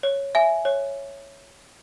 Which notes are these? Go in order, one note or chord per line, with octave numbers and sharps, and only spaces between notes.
C#5
E5 G#5
C#5